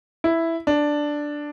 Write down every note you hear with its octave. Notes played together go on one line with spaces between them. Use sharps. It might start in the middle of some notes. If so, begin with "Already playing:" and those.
E4
D4